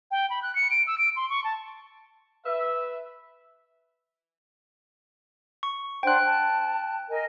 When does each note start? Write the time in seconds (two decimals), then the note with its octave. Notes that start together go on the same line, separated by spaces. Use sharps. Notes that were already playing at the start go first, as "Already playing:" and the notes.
0.11 G5
0.30 B5
0.43 F#6
0.55 C#7
0.71 D7
0.87 E6
0.98 D7
1.16 C6
1.30 C#6
1.44 A5
2.46 B4 E5
5.63 C#6
6.03 D4 C5 F#5 G5 F#6
6.24 A5
7.09 A#4 D#5 G#5